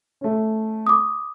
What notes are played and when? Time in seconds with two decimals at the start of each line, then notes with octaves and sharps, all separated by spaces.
0.21 A3 C#4
0.87 D6 D#6